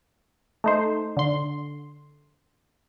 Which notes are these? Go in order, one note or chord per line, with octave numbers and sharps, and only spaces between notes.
A3 D#4 C5
D3 C6